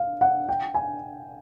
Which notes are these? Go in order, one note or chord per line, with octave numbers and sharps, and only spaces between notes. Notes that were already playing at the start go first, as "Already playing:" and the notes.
Already playing: F5
F#5
G5
G#5